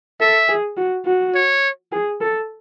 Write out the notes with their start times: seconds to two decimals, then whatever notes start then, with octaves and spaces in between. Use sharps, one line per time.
0.20 A4 E5
0.49 G#4
0.77 F#4
1.06 F#4
1.35 C#5
1.92 G#4
2.21 A4